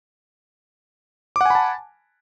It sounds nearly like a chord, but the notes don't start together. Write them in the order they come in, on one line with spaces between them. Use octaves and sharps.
D6 F#5 G#5 B5 A5